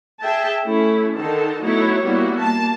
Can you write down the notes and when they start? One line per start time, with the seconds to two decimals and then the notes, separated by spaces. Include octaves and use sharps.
0.22 G#4 E5 G5 A5
0.64 A3 C#4 E4
1.17 D3 D#3 D#4 A4 A5
1.62 F#3 A3 B3 D#4 E4 C#5
2.03 G3 A#3 B3 E4 F#4
2.40 A#3 A5